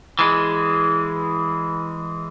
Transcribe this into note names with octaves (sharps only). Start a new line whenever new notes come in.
E3 G#3